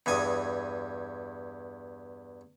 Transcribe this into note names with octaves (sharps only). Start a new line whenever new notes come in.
E2 G2 G#5 D#6